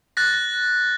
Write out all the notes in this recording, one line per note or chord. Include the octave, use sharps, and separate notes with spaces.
F#6 A6 A#6